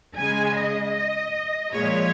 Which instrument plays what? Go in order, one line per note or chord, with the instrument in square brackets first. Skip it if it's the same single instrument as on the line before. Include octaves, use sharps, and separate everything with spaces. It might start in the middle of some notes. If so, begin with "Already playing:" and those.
[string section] C#3 G#3 G#5
D#5
A#2 F3 G#3 C#5